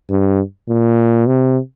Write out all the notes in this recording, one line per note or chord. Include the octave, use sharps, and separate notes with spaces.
G2
A#2
C3